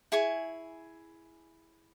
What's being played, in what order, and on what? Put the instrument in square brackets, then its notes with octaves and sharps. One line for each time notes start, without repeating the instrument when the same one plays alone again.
[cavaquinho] E4 G#4 G#5 C#6